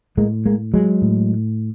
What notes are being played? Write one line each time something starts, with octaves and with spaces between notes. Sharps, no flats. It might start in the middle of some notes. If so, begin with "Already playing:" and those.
A2 G#3 A#3
G#3 A#3
F#3 G#3
A2